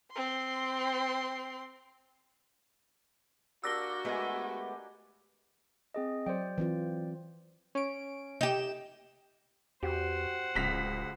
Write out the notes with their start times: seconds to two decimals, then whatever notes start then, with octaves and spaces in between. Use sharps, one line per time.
0.11 C4 C6
3.64 A#3 D4 F#4 G4 E6 A#6 G7
4.05 G#3 A3 B3 G4 G#5
5.94 C4 G#4 D#5
6.26 F#3 C5 D5 G5
6.58 E3 C4 F4
7.75 C#4 D7
8.41 D#4 G4 G6 E7
9.83 E2 F#4 G4 C5 F#5
10.55 D1 C#2 B6 F7